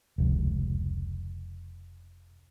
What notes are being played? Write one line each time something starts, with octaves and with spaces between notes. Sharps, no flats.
F1 C#2